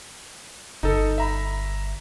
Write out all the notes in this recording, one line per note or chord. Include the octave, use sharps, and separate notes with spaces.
G1 D#4 A4
E5 A#5 B5